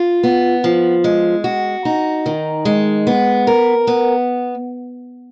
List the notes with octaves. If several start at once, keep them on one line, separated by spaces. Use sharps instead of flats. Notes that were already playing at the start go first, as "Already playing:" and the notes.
Already playing: F4
B3
F3
G#3
F#4
D#4
D#3
G#3
B3
A#4
B3